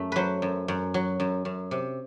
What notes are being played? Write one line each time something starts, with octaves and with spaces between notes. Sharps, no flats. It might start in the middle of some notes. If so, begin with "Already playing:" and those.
Already playing: F#2 A3
F#3 B4 C5
F#2
F#2
F#3
F#2
F#2
C3